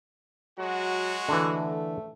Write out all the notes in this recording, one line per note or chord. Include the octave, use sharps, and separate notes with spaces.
F#3 G#3 F#4
D3 E3 A3